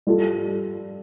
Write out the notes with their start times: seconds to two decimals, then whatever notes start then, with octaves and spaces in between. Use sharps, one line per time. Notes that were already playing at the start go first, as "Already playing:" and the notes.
0.07 G3 F4 A4